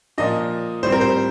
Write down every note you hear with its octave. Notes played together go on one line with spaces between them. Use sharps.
A#2 F3 A#3 D4 D#5
A2 G3 C4 C5
A#4
C5